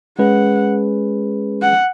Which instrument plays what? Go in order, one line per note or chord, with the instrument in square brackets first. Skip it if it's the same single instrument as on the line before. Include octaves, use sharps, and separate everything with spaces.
[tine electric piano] G#3 C#4 G#4 B4 [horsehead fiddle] F#5
[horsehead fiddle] F#5